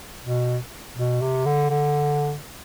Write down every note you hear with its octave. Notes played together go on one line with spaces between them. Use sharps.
B2
B2
C3
D3
D3